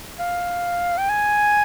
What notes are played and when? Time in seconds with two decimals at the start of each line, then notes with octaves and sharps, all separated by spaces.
0.19 F5
0.98 G5
1.09 G#5